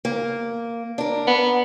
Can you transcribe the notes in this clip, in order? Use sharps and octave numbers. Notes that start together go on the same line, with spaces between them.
A#3
D4 A#4
B3